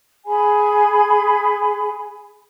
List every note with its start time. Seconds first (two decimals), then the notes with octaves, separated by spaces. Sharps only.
0.26 G#4 G#5 B5